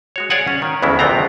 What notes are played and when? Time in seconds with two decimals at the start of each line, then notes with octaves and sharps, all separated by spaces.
0.16 G#3 F#4 C#5
0.30 G#4 C#5 D5 F5 F#5 G#5
0.47 C#4
0.62 D#3
0.82 D2 C#3 E3 G#3 B3 E4
0.99 A#1 F2 C3 B3 C4 A#5